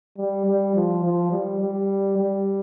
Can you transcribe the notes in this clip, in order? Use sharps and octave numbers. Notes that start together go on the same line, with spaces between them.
G3
G3
F3
F3
G3
G3
G3